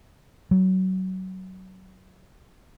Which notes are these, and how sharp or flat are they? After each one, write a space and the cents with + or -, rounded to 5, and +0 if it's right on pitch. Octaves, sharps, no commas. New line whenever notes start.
F#3 +20